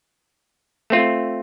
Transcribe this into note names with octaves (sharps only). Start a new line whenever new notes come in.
A3 C4 F4